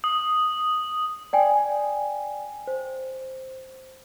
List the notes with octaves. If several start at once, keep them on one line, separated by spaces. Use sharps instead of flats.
D#6
D5 G5 G#5
C5